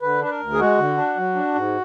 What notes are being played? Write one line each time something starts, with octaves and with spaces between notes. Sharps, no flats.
D3 B4
D4 B4
A#4
D2
G#4
G#3 F#4
D3
D4
F#3
D4
G#2